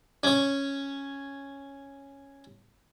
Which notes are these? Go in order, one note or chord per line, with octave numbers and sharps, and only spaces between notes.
C#4 C#5